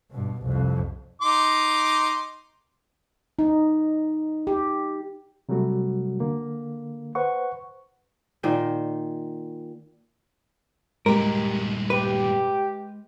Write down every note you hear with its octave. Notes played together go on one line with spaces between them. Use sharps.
G2 B2
C2 F2
D#4 C6 D6
D#4
G4
C3 F#3 G3 A3 F#4
D3 A#3
B4 C5 F#5 C#6
A#2 D#3 C5
G2 A#2 G#3 G4 A#4
G4 B4